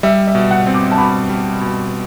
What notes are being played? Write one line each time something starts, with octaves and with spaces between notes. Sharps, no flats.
G3 E5
E5
B2
F#5
C4
D6
A5
B2 B5
G3
B2